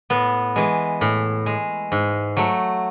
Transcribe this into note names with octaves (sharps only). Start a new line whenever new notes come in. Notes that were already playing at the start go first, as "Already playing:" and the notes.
A2 B3
E3 G#3
A2
G#3
G#2
F#3 A3